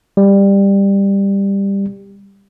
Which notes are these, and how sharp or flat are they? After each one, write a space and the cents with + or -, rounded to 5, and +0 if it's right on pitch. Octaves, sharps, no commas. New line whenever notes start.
G3 +15